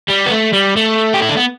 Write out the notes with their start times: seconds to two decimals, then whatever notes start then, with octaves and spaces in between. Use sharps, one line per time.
0.08 G3
0.26 B3
0.31 A3
0.53 G3
0.77 A3
1.14 G4
1.22 E4
1.29 D4
1.37 B3